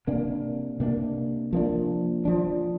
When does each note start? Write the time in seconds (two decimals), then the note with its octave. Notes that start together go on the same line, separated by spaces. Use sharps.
0.07 C3 A#3 D4
0.80 C3 A#3 D4
1.53 F3 A#3 D4
2.25 F3 D4